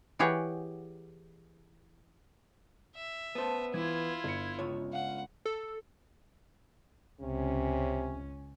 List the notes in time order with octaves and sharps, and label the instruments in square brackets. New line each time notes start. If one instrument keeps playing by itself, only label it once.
[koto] E3 G4 G#4 C#5 F#5
[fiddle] E5
[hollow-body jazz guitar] B3 C5 [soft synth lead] A5
[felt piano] E3 [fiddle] E4 F4 [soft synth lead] G#6
[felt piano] G1 C#7
[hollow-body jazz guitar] C#2 F4 C#5
[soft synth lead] F5 [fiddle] F#5
[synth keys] A4
[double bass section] C#2 C#4 [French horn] C3